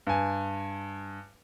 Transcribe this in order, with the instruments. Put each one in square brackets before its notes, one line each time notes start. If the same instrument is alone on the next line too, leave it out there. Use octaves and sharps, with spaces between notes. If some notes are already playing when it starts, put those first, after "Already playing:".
[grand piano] G2 G#5